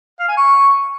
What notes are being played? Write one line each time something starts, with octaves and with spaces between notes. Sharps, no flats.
F5
G#5
C#6